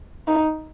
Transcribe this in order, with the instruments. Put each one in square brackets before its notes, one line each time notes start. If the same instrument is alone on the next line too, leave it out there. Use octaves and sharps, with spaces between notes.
[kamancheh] D#4